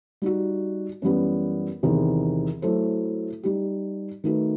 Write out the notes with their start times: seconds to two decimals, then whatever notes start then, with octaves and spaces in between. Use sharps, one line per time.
0.22 G3 D#4 F#4
1.02 F#2 E3 G3 B3
1.83 E2 C3 D#3
2.62 F#3 A3 E4 A4 C5
3.43 G3 D#4 G4
4.24 D#3 A3 D#4 F#4 B4